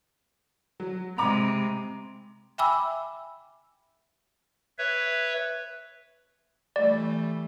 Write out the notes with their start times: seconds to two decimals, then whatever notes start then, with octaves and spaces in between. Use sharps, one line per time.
0.80 F#3
1.18 C3 G#3 A#5 B5 D6
2.58 E5 G5 G#5 B5 D6 E6
4.79 B4 C#5 E5
6.76 E3 G3 A3 D5